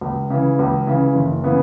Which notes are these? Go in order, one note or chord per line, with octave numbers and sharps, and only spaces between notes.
C#2
C#3 E3
C#2
C#3 E3
F#1
C#3 E3 B3